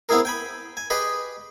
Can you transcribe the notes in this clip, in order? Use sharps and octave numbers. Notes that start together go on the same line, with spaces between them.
B3 C4 E4 G#4 A#4
G5 G#5 B5
G#5
G4 G#4 B4 D#5 B5